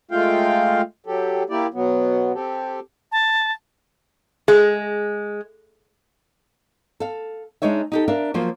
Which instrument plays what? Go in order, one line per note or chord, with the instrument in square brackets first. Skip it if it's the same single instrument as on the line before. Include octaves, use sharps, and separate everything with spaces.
[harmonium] G#3 A3 F4 F5 G5
F#3 G4 A4
A#3 E4 G4 D5
B2 F#3 B3
C4 G4 A4
[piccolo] A5
[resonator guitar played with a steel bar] G#3 [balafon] G#4
[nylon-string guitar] A4 F5
G#3 D4 D#4 C#5 E5
D#4 G4 A4
D4 A#4 E5 F5
F3 F#3 A#3 C5